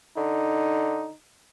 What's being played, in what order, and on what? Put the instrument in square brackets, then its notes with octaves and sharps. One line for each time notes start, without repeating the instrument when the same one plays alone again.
[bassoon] D3 [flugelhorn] D#4